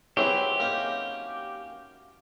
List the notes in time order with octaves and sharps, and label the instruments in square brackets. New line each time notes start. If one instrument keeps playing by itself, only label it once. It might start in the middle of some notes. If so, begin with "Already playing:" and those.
[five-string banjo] F#3 C4 E4 [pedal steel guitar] G4 [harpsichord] G#4 B4
[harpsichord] A#3 C#4 D#4